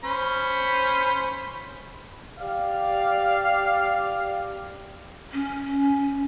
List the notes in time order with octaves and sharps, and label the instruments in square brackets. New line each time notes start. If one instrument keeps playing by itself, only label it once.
[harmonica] C#4 C5 B5
[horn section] G4 D5 F5
[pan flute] C#4